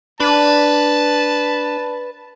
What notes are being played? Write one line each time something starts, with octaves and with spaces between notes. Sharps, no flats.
D4 B4 A5